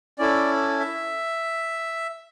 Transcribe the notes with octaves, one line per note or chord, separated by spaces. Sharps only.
C#4 E4 A4 D5
E5